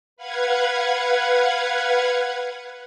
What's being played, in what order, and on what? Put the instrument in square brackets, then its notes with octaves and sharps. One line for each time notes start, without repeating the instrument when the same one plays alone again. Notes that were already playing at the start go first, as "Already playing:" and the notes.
[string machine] B4 F5 F#5 G#6